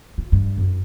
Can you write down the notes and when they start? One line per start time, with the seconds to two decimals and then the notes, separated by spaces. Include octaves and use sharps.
0.18 F4
0.32 G2
0.58 F#2